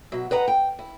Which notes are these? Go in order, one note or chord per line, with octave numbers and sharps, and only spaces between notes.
B2 F#3 E5
B4 D#5 F#5 A#5
G5
E4